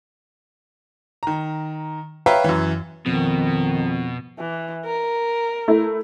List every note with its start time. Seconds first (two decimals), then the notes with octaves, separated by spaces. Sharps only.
1.23 D#3 A#5
2.26 B4 C#5 E5 F5 G5 A#5
2.44 F#2 E3
3.06 F2 B2 D#3
4.39 E3
4.86 A#4
5.68 A3 E4